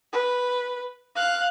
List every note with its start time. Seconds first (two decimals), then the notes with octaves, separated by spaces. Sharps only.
0.12 B4
1.15 F5 F#6